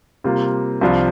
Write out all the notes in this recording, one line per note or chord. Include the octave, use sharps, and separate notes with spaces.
C3 G3 A#3 F4
C2 C3 F3 D4 F4